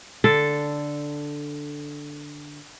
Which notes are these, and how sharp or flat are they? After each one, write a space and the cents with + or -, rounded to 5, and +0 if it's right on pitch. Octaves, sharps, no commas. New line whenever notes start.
D3 +0 A4 +0